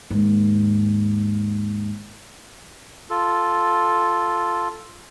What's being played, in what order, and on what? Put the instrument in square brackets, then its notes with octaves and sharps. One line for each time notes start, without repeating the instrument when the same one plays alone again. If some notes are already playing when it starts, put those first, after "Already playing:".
[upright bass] D#2 G#2
[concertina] F4 A4